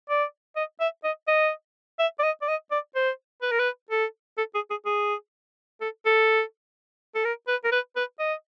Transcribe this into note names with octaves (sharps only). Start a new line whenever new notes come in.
D5
D#5
E5
D#5
D#5
E5
D5
D#5
D5
D#5
D5
C5
B4
A#4
B4
A4
A4
G#4
G#4
G#4
A4
A4
A4
A#4
B4
A#4
B4
B4
D#5